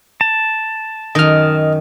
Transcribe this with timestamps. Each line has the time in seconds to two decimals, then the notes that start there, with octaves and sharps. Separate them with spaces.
0.21 A5
1.15 F#2 D#3 D#5 F6